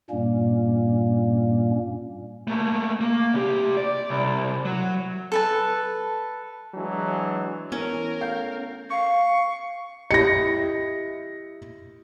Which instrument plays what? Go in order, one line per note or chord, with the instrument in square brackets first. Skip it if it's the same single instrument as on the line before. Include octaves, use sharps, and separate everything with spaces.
[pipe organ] G2 A#2 G3 A#3 C#4
[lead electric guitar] A3 A#3
A#3
C2 G4
D5
C2
F#3
[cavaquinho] A4 B4 A5
[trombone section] E3 F#3 G#3 D4
[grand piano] E3 [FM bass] B3 [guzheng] C#4 [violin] A#4
[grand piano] A3 F5 G6
[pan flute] F5 [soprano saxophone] C#6
[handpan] E4 G4 D#5 [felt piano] A#6 C#7